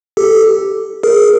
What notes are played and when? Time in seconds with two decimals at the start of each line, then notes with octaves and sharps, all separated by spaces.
0.17 G4 A4
1.03 G#4 A#4